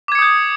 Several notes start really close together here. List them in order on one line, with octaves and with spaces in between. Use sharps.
D6 G#6 C#7 D#6 G6